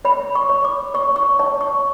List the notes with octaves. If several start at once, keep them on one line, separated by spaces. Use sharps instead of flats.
C#5 B5
C#6
C#5
D6
C#5 C#6
C#6
C#5 A5
C#6